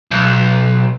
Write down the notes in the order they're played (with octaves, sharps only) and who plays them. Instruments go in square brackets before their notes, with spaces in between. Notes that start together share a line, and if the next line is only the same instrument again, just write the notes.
[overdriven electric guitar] B1